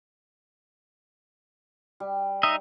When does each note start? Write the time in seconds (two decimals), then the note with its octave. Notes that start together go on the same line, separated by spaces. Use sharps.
2.00 G3
2.43 D#4 D#5 E5